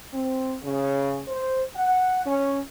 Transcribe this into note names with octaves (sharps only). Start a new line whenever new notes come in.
C4
C#3
C5
F#5
C#4